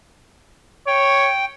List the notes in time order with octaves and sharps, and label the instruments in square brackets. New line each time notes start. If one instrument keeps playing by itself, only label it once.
[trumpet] C#5 [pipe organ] G5